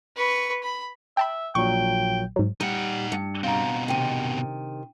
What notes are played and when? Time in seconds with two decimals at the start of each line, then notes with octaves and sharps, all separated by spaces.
0.17 B4 C#6
0.63 B5
1.17 E5 G5 A5 B5
1.55 A#1 A#2 F#3 G5 C#6
2.36 G#2 F#3
2.61 G3 D#4 F#5
3.12 G2 C#7
3.44 B2 C4 F5 A#5
3.88 C3 D#3 D4 G5 D#7